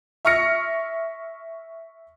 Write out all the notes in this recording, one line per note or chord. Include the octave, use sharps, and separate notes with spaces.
E5 C#6 F6 A#6 C#7